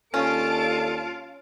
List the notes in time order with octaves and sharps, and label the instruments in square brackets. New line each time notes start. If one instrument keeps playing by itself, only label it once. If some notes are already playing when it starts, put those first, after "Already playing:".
[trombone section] D#2 D4 A4 [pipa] C#4 [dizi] F4 [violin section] A5 D7